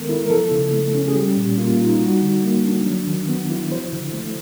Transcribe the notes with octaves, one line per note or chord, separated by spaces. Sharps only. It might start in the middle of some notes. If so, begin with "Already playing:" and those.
Already playing: D#3 G#3 B3 A4 A#4
E4
A#4
F3 A4
C#3
A3
C#4
G#4
G3 G4
A#2
A#3 F4
F4
D#4
G3 F#4
D3
A#3
D4
F#3
D#3
B3
E4
F3 C5
D3
A3